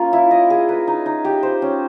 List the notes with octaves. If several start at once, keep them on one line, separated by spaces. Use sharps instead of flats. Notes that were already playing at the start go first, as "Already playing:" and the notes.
Already playing: A#3 C#4 F4 A#4
E4
D#5
G#4
B4
D#4
D#4
G4
C5
C#4